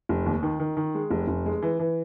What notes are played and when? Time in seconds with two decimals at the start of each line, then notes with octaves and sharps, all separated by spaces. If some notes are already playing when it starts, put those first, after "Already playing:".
0.09 F1
0.26 D#2
0.43 D#3
0.60 D#3
0.77 D#3
0.95 G#3
1.10 F1
1.28 F1
1.46 G#3
1.62 E3
1.79 E3